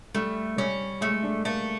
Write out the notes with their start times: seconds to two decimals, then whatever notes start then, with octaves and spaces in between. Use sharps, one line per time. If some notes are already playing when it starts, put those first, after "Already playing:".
0.15 G3 A3
0.58 G3 C#4
1.01 G#3 A3
1.23 D4
1.45 A3 A#3